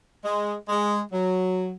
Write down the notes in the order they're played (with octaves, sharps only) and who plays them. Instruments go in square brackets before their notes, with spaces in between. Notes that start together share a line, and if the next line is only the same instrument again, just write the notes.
[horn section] G#3
G#3
F#3